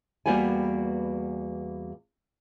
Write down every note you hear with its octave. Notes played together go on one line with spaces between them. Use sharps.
E2 G3 A#3 B3 F#4 G#5